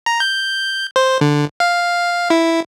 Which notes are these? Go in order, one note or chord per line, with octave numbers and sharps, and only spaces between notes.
A#5
G6
C5
D3
F5
E4